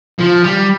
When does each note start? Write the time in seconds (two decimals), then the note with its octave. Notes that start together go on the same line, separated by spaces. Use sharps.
0.20 F3
0.44 G3